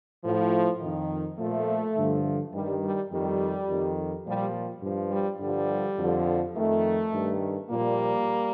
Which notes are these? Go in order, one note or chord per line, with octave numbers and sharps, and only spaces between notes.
A2 F3
F2 D#3
A#2 F3 A3
G2 D3 F3
G2 D#3 G3
G3
F2 D#3 G3
F2 D#3
A#2 F3 G3
G2 F3
G3
G2 D3 F3 G3
F2 D3 F3
F2 D#3 A3
G2 D#3
A#2 F3 G3 A#3